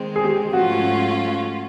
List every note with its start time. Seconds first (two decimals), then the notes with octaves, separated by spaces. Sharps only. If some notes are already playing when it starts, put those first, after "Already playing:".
Already playing: D#3 G#3 C4
0.16 G#4
0.24 G4
0.53 G#2 F3 A3 C#4 F4 F#4